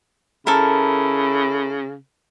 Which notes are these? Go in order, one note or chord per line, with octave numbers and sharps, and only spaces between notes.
C#3 E4 A4 A#4